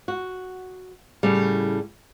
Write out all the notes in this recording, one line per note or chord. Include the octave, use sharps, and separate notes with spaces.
F#4
A2 C#3 G3